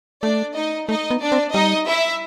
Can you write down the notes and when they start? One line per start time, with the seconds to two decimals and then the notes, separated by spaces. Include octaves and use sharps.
0.23 A3 D4 D5
0.56 D#4 D#5
0.89 A3 D#4 D#5
1.11 B3
1.21 D4 D5
1.32 C4
1.54 G3 D#4 D#5
1.87 E4 E5